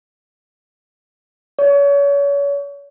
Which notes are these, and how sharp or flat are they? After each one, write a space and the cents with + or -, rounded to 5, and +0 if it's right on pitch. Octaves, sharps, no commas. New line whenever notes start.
C#5 +35